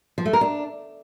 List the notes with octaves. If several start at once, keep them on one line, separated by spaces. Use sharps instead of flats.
F3
A3
A#4
D4